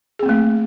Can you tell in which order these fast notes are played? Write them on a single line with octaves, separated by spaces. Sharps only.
G#4 C4 A#3 A3